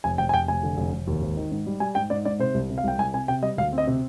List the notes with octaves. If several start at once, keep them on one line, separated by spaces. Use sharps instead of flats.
F1 G#5
F1 G5
G#5
F1 G5
F1 G#5
D3
F1
F1
D#2
G#1
D#3
G#2
G3
G3 G#5
G#2 G5
G#2 D5
G#2 D5
C3 C5
C2
C3
F5
C2 G5
C2 G#5
C3 G#5
C3 G5
G3 D#5
D2 F5
C4
D#5
C3